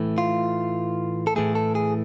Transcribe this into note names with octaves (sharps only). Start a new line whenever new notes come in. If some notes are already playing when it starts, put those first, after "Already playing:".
Already playing: A2 E3 A3
F4
A4
A2 E3 A3 G#4
A4
G#4